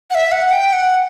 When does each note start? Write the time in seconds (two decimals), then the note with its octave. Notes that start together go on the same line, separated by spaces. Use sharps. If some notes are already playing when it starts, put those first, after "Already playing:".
0.11 F#5
0.15 E5
0.32 F#5
0.52 G5
0.73 F#5